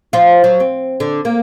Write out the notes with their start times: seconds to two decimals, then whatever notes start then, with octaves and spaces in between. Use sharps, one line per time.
0.13 F3 F4
0.44 F#3
0.60 C4
1.00 D3
1.25 A#3